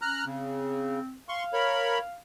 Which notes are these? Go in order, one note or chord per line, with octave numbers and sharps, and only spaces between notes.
C#4 A#5 F6 F#6
C#3 C4
F5 C6 C#6
A#4 C#5 B5